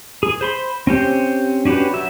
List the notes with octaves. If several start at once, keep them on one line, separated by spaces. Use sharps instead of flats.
G#4
C5 B5 C6
C4 C#4 G4 C5
C#4 D4 F#4 G4 B4
F#3 E5